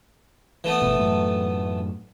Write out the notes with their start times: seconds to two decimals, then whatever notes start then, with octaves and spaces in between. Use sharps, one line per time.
0.64 E3 A3 B3
0.82 G1 B2
0.99 F#2 A2